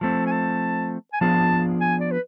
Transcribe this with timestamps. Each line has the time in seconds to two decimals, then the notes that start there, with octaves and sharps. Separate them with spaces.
0.01 F3 A3 C4 A5
0.27 G#5
0.32 A5
1.13 G#5
1.21 F3 B3 D4 F4 G#4 A5
1.81 G#5
2.01 D5
2.12 B4